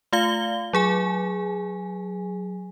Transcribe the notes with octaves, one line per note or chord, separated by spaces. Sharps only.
A3 F4 F5 G7
F#3 G#4 G#5